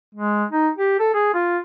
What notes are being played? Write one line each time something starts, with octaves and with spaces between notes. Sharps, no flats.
G#3
D#4
G4
A4
G#4
F4